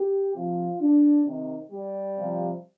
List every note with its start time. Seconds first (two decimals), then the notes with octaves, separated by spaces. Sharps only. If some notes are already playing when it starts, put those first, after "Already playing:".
Already playing: G4
0.35 C3 F3 F4
0.81 D4
1.26 C3 D#3
1.72 G3
2.18 C3 F3